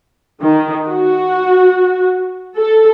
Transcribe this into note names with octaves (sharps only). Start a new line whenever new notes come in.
D#3
F#4
A4